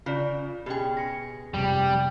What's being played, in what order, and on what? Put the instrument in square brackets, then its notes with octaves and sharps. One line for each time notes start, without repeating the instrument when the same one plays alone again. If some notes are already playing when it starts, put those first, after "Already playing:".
[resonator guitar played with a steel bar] C#3 [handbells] F4 D5
[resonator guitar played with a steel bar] B2 C#4 G#4 [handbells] G4 G5
[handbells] A#6 C#7
[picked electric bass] F1 C3 [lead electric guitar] G3